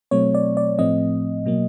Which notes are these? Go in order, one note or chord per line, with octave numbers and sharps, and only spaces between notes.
B2 F#3 A3 C4 C#5
D5
D5
A2 F3 A3 C4 D#5
B2 F#3 A#3